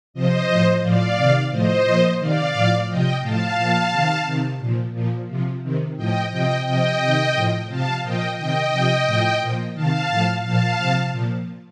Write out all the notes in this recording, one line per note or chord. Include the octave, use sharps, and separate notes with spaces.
C3 F3 C5 D#5
A2 F3
A2 F3 D5 F5
C3 D#3
A2 F3 C5 D#5
A#2 F3
C3 D#3 D5 F5
A2 F3
C3 F3 D#5 G5
A2 F3 F5 A5
A#2 F3
C3 D#3
C3 D#3
A#2 F3
A#2 F3
C3 F3
C3 D#3
A2 F3 D#5 G5
C3 F3 D#5 G5
C3 F3 D#5 G5
C3 D#3
A2 F3
C3 F3 F5 A5
A#2 F3 D#5 G5
C3 D#3 D#5 G5
C3 F3
A2 F3
A#2 F3
C3 D#3 F5 A5
A2 F3
A#2 F3 F5 A5
C3 F3
A#2 F3